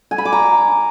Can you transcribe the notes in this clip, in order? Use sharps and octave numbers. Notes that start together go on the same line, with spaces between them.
G#5
B5
D6
A#5